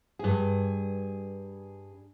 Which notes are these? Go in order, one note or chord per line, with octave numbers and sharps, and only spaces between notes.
G2 G#4